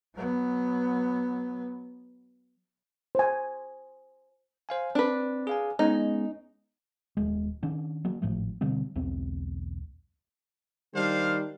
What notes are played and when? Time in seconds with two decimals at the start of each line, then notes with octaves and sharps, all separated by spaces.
0.15 F#3 B3
3.15 C5 G#5
4.69 C5 F5 G#5
4.95 C4 D4 B4
5.47 G#4 F5 G#5
5.79 G#3 B3 C#4 D#4
7.17 D#1 G#3
7.63 D#3 C#4 D4
8.05 F#3 A#3
8.22 G#1 A2 F3 A3
8.61 B2 D3 G3 C4
8.96 B1 E2 C4
10.95 D#3 G3 D4 C5 F5